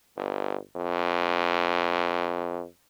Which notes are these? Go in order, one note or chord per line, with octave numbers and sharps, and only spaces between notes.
G1
F2